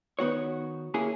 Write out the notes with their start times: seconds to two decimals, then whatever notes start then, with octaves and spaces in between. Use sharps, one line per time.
0.19 D#3 B3 F#4 C#5
0.94 A#3 C#4 E4 G#4